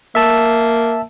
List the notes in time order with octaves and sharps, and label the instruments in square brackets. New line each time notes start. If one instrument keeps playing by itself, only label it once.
[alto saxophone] A#3 [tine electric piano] E5 A5 E6